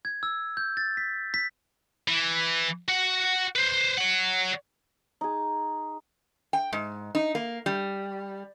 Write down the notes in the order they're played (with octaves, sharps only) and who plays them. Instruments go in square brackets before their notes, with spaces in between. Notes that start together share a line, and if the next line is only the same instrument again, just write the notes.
[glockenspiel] G#6
E6
G6
A6
B6
B6
[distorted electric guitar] E3
F#4 F#5
B4 C5
C#5 F#5
[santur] D#4 G#4
[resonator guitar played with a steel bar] G5
G#2
D#4
A#3
G3